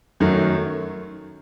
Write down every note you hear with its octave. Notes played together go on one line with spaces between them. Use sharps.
F#2 D#3 F#3 A3